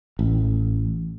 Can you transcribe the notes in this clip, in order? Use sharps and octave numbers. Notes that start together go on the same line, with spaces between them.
A1